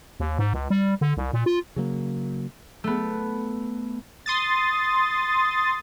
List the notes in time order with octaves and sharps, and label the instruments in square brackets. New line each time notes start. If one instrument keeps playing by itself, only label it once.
[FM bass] D#2
G#2
C#2
G3
D3
C2
A#2
F4
[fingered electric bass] C#3 F#3 A#3
[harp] A3 B3
[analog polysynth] C6 D#6 A6